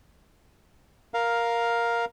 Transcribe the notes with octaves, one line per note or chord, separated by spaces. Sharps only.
A#4 F5